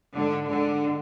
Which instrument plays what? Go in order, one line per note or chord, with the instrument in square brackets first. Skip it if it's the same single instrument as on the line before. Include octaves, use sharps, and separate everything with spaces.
[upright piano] G#2 [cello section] D3
[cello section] D3 [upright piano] G#3 D4